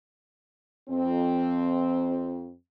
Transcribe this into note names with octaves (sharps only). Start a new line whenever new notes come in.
F2 C4